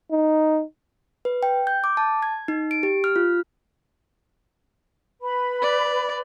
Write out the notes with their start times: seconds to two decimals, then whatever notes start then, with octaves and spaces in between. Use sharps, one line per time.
0.12 D#4
1.25 B4
1.43 G5
1.67 G6
1.84 D6
1.97 A5
2.23 G#6
2.48 D#4
2.71 D7
2.83 G4
3.04 F6
3.16 F4
5.21 B4 B5
5.62 D5